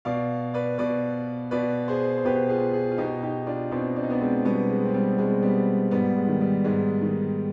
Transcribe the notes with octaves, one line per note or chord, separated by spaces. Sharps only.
B2 D5 F5
B4 D5
B2 B4 D5
B2 B4 D5
G#4 C5
C5
B2 G4 B4
F4 G#4
F4 G#4
F4
B2 D#4 G4
D#4 G4
D4 F4
B2 C4 D#4
D4
D#4
B3 D4
G#3 C4
B2 G3 B3
G#3
C4
G3 B3
B2 G#3 C4
G3 B3
G#2 G3 B3
G#3
D#3
G3
G#2 G#3
D#3